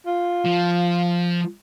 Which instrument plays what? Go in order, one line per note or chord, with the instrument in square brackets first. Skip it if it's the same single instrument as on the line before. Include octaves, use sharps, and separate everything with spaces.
[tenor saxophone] F4
[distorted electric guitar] F3